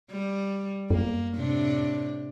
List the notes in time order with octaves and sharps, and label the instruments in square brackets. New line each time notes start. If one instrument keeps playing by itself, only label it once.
[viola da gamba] G3
[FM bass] F#2 [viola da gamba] A#3
[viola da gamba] A2 C3 D4